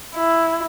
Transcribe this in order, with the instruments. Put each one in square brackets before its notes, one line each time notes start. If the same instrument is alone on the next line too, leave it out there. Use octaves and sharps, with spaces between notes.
[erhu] E4